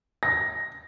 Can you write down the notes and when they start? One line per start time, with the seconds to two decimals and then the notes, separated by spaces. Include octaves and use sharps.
0.23 A#6